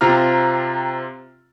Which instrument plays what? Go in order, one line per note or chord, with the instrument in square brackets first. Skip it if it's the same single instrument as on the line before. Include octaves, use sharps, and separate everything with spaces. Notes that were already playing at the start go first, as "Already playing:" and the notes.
[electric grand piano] C3 C4 F4 A#5 F6